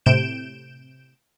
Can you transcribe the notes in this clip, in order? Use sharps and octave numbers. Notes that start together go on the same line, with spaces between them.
A2 C3 G6 D7 E7